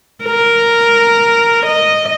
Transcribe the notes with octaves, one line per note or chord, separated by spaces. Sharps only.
A#4
D#5